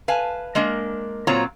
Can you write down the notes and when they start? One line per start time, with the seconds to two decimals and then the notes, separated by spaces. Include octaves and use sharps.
0.08 B4 F5 G#5 A5
0.55 G#3 A#3 D4 A#4
1.27 A#2 F#3 C4 F4 C#5 A#5